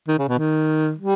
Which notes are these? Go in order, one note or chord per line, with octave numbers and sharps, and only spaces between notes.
D#3
C#3
B2
D#3
G3